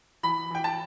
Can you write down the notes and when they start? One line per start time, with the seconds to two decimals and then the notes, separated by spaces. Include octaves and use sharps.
0.23 E3 B5
0.50 E3 G5
0.64 A5